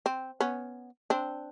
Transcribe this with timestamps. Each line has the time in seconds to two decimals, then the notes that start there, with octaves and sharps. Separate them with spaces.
0.06 C4
0.40 B3 C#4
1.10 C4 D4